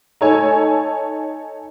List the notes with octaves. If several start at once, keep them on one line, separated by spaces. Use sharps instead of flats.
D#4 A4 C#5 G#5 A5